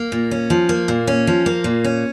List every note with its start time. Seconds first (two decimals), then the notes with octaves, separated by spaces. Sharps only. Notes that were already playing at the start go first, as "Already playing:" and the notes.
Already playing: A#3
0.12 A#2
0.31 C#4
0.50 F3
0.69 A#3
0.88 A#2
1.07 C#4
1.27 F3
1.46 A#3
1.64 A#2
1.84 C#4